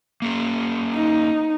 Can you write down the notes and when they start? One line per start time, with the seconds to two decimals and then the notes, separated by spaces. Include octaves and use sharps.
0.22 A#3 C#4 G#4
0.94 D#4